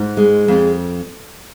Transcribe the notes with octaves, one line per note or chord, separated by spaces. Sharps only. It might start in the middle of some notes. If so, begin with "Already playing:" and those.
Already playing: G#2
G#3
F2